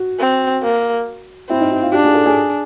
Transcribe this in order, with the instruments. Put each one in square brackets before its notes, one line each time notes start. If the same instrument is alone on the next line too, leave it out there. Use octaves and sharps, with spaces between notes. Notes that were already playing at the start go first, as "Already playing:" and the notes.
Already playing: [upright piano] F#4
[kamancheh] C4
A#3
[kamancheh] C4 [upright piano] E4
[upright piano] D#4
E4
F4
[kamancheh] D4 [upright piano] G4
[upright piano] G#4
A4
G#4